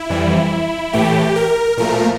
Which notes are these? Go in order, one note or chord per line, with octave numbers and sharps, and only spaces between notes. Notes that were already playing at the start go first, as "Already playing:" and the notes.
Already playing: E4
F2 E3 G3
A2 E3 A3 G4
A#4
A#2 F3 A3 A#4